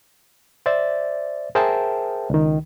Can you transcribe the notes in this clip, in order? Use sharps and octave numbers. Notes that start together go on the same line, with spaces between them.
C5 D5 E5 A6
G#4 A#4 C5 E5 G5 A5
C#2 D#3